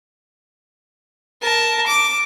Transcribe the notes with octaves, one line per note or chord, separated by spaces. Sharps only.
A#4 A5
D6